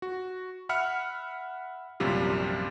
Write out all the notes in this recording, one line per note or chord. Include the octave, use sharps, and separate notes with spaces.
F#4
E5 F#5 B5 F6 C#7
A#1 F#2 C3 G3 F4